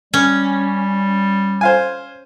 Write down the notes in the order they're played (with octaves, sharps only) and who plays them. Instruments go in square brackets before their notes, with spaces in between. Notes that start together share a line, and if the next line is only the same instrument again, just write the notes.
[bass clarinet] G3 [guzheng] C#4
[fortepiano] C5 F5 G#5